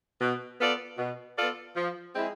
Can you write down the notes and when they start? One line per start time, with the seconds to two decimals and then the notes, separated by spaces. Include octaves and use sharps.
0.21 B2
0.60 B3 F4 A4 D5
0.98 B2
1.37 B3 F4 A4 D5
1.77 F3
2.15 G#3 C4 E4 G#4